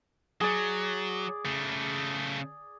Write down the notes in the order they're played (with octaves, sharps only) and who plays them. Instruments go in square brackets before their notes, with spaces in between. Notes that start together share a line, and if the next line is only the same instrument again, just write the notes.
[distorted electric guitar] F#3 [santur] G#4 D5
[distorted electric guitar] C#3 A3